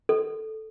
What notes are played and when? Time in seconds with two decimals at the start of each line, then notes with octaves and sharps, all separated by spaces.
0.09 A4